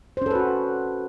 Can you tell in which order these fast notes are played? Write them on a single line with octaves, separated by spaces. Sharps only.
C5 C#4 A4 B4 F#4